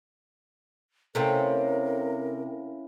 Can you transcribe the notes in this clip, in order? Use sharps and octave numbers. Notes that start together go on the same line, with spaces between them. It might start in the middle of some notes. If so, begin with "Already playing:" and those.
C3 A3 C4 C#4 E4 A#4 F5